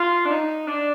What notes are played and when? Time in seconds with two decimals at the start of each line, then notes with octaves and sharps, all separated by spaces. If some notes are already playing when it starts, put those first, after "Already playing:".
Already playing: F4
0.25 D4
0.30 D#4
0.68 D4